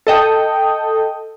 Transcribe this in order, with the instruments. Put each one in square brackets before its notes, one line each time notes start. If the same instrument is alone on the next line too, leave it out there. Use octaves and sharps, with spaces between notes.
[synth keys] A4 D#5 G5